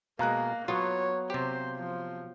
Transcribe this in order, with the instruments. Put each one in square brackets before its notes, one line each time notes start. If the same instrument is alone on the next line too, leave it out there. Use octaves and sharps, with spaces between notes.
[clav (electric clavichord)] B2 G#3 [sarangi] A#3 [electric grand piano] F5 A#5 F#6
[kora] F#3 B3 [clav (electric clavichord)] F4 [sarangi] C#5
[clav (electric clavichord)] C3 G4 [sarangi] C5
[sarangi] F3